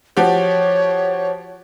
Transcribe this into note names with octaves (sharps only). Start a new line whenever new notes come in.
F3 F#4 G4 C#5